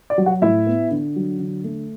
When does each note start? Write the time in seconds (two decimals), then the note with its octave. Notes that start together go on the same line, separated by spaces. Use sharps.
0.10 D5
0.18 F#3
0.26 F#4 F#5
0.42 A2 E4 E5
0.67 B3
0.91 D3
1.16 F#3
1.39 D3
1.64 A3